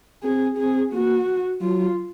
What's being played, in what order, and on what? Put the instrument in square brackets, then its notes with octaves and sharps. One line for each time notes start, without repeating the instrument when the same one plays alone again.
[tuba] C4 [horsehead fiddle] G#4
[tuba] C4 [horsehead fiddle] G#4
[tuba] A#3 [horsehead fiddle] F#4
[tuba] F#3 [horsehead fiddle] F4